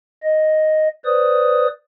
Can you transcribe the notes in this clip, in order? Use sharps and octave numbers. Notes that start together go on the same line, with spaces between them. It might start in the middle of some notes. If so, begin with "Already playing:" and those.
D#5
B4 C5 D5 D#6